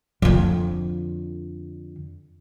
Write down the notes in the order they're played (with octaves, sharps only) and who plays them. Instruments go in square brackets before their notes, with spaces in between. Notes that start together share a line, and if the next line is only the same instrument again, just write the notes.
[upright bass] F2 D3